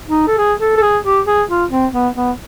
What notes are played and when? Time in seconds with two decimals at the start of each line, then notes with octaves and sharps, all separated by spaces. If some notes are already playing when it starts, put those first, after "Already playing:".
0.09 D#4
0.28 A4
0.38 G#4
0.60 A4
0.77 A4
0.82 G#4
1.05 G4
1.27 G#4
1.49 F4
1.71 C4
1.93 B3
2.16 B3